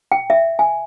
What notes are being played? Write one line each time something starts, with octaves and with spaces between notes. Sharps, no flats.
G5
E5
G#5